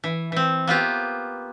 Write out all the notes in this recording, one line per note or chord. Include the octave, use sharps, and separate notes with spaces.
E3
E3 C4
A#3 B3 F4 G4